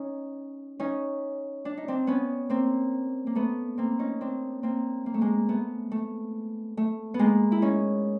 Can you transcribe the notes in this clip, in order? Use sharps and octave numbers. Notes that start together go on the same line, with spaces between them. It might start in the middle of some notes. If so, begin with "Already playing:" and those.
Already playing: C#4 D#4
C#4 D#4
D4
D#4
C4 D4
B3 C#4
A#3 C4
A#3
A3 B3
A#3 C4
C#4 D#4
C4 D4
A#3 C4
A#3
A3
G#3 A#3
A3 B3
A3
A3
B3
G#3 A#3
E4
C#4 D#4